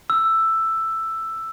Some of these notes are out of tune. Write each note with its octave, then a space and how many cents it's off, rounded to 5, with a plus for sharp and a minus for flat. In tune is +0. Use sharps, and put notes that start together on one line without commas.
E6 +5